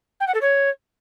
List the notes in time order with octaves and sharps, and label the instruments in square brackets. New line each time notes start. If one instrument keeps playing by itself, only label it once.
[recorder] G5
F#5
A4
C#5